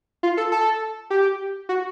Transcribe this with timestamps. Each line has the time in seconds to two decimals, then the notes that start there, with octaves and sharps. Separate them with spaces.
0.23 F4
0.37 A4
0.52 A4
1.10 G4
1.69 F#4